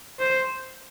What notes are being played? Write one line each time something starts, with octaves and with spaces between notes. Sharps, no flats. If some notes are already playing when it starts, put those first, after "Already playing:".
C5